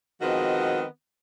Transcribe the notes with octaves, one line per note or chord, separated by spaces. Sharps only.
D#3 F3 G#3 B3 C4 F#4